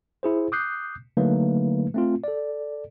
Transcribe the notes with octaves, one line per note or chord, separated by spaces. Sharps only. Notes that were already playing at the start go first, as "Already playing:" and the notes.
E4 G#4 C5
D6 D#6 F#6 G6 C7
D3 F#3 A3 A#3 D#4 B4
A3 C4 F4
A4 D5